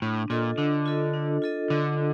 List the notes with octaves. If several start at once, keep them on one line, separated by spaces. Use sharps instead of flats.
A2 D4
A#2 F4 A4 D#5
D3 D4
F4 A4 D#5
D4
F4 A4 D#5
D3 D4